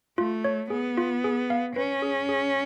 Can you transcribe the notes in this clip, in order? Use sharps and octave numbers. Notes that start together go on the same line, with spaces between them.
A3 F4
C#5
B3 G#4
F4
G#4
F5
C#4 B4
G#4
G#4